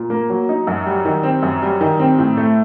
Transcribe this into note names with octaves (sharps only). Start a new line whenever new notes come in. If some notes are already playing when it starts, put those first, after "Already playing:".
Already playing: A#2
A#3
F#3
D#4
F#2
G3
D#3
C4
F#2
G3
D#3
C4
A2
A3